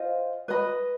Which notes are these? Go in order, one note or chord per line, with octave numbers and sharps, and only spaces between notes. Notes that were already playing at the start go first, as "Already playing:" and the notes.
Already playing: F4 C5 D#5 G5
B4 D#5 B5